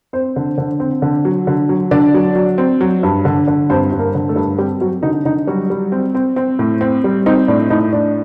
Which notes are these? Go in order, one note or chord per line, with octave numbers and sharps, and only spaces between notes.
C4 C5
D3
D3
C4
D3
F#3
D3
F#3
D3 D4 D5
F#3
F#3
C4
F#3
G2
D3
D3
G2 C4 C5
G2
A#3 A#4
D3
A3 A4
G2
G3 C4 G4
F#3 C4 F#4
D3 D#4
D3 D#4
F#3 G3 F#4
G3
C4
C4
C4
A2
C4
G3
C4 D#4
A2 D4
A2 D#4
A2 D4